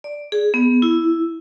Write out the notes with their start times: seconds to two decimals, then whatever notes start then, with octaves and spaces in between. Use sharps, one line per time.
0.04 D5
0.32 G#4
0.54 B3
0.82 E4